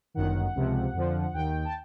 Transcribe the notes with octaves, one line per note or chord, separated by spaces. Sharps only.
G1 F#2 D#3 F#5
C#2 C3 F3
F2 D3 F3
D#2 D#3 G5
A5